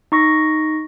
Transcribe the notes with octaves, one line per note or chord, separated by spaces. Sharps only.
D#4 C#6 A#6